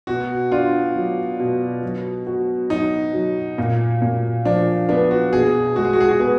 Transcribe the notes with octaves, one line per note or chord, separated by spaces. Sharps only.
B2 F#4
D4 F4
F#3
B2
F#3
F#4
F#3 D#4
F#3
A#2
A#2
F3 D4
B3 D4
F#4
B2 G#4
G#3 F#4
G#4
F#4
G#4
F#4
B3 G#4